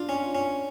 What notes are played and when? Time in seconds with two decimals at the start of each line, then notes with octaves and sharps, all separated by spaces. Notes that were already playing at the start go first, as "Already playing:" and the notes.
Already playing: D4 F4
0.09 C#4
0.35 C#4